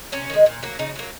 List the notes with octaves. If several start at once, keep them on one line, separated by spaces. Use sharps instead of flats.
C3 C#4
D#3 G#3
A#2
F#3 A#3
C#3 D#4
F#3 A#3